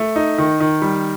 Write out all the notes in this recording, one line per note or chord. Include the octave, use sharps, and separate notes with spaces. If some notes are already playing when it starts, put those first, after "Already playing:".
Already playing: A3
D#4
D#3
D#3
G3